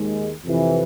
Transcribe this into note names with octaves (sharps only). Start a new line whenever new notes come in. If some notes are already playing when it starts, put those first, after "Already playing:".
Already playing: D#2 D#3 G#3
F2 C3 E3